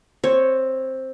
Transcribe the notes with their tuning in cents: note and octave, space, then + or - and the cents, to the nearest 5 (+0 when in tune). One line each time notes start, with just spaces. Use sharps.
C4 +10 C#5 +0